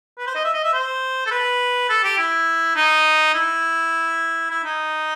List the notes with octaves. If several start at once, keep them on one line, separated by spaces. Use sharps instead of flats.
B4
C5
D#5
E5
D#5
E5
C5
A4
B4
A4
G4
E4
D#4
E4
E4
D#4